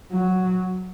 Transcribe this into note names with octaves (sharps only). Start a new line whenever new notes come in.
F#3